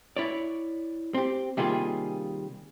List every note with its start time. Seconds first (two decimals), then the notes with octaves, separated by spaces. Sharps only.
0.17 E4 C#5 D5
1.14 C4 G4
1.57 C3 D#3 G3 A#3 F4 G#4